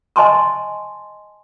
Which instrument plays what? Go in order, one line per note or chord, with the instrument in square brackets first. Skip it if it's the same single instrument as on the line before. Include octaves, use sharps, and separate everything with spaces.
[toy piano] D#5 G#5 A5 C6 C#6